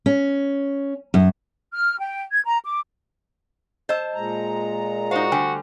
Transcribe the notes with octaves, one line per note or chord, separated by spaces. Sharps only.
C#4
F#2
F6
G5
G#6
A#5
D6
C5 D#5 A5 E6
A#2 G#3 A#5
D#4 F#4 C5 F5 C#6
D3 G3 A3 G5 G#5 D#6